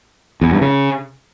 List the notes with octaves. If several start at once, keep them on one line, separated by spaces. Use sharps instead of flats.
E2
G2
C#3